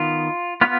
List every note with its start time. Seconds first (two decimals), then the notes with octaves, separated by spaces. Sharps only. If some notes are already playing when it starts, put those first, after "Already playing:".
Already playing: D#3 B3 F4
0.61 B3 F4